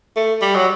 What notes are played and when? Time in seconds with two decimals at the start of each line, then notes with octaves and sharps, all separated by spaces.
0.16 A3
0.42 G3
0.55 F#3